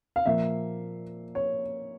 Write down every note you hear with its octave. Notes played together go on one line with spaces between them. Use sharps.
F5
A#2 F3 A#3 E5
C#5